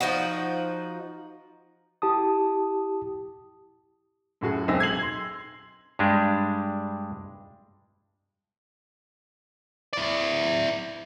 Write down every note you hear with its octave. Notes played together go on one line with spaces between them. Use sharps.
F3 D#4 F#4
E4 G4 A5 D#6
F#2 A2 F#4 G#4
E1 B1 C4 G#5 E6 A#6
G#6 C7 F#7
C6
G2 G3 G#3 D4
E4 D5